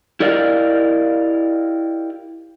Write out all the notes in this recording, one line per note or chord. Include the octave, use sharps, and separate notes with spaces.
E4 G4 A#4 D5 D#5 F5